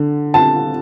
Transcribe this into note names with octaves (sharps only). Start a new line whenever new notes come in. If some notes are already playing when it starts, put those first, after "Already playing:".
Already playing: D3
A5